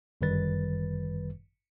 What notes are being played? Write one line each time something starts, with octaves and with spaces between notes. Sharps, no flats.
G1 F#2 D#3 G3 B4 A6